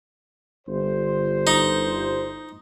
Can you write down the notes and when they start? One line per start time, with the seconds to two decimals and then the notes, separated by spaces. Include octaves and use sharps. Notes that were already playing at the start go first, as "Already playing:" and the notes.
0.67 G1 C5
1.47 D#4